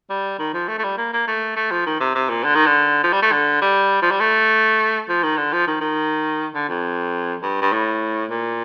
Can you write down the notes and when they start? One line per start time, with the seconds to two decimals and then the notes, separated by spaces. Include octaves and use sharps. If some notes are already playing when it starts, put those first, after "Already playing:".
0.10 G3
0.39 D#3
0.53 F3
0.68 A3
0.78 A3
0.84 G3
0.97 A#3
1.13 A#3
1.27 A3
1.56 A3
1.71 F3
1.86 D#3
2.00 C3
2.15 C3
2.30 A#2
2.44 D3
2.55 D#3
2.66 D3
3.04 F3
3.13 G3
3.22 A3
3.32 D3
3.61 G3
4.02 F3
4.11 G3
4.20 A3
5.09 F3
5.23 D#3
5.37 D3
5.53 F3
5.67 D#3
5.81 D#3
6.55 D3
6.69 F2
7.42 G2
7.62 G2
7.73 A2
8.31 A#2